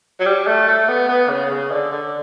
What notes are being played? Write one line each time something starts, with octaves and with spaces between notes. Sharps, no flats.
F#3
G3
A3
A3
B3
B3
C#3
C#3
D3
D3